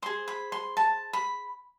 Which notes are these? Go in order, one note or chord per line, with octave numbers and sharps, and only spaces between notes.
G#4 C5 C6
B5
C6
A5
B5